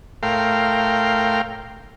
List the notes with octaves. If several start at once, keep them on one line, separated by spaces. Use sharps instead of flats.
A2 A#4 F5 G5 C6